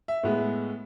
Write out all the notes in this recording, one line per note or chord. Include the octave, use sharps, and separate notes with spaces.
E5
A2 G#3 B3